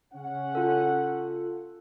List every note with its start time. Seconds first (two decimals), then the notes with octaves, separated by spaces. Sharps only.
0.13 C#3 C#4 F#5
0.55 F4 A4